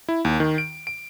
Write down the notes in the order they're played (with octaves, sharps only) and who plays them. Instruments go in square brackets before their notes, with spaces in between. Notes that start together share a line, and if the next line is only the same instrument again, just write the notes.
[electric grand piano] E4
D#2
D#3
D7
D7